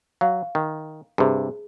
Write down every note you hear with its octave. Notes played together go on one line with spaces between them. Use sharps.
F#3 F5
D#3
G2 C3 G#4